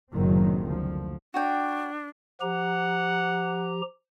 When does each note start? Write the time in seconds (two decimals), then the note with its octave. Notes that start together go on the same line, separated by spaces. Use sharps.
0.14 F#1 A2 C3 D#3 F#3 C4
0.63 D2 F3
1.34 D4 F#4 C#5 G5
2.41 F3 G4 F#5 A#5